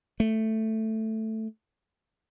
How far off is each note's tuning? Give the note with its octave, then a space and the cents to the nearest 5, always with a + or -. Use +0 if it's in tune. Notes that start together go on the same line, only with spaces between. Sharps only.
A3 +5